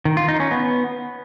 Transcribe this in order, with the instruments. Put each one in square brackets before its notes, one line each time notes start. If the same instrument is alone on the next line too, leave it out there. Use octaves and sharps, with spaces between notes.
[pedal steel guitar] D#3
F4
D#4
C#4
B3